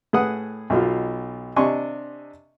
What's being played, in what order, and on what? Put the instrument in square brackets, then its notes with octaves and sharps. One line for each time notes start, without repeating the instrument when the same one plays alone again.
[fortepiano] A2 G#4 B4 F#5 D#6
B1 B2 F4
C3 D4 D#5 G#5 C6 C#6